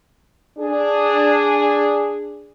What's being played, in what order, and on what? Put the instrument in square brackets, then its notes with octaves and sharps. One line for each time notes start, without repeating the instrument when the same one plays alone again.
[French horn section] D4 G#4